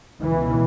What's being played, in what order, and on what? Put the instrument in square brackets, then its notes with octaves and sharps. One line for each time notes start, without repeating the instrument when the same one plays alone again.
[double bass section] C#2 B2 E3